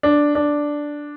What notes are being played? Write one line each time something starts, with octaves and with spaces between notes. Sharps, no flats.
D4
D4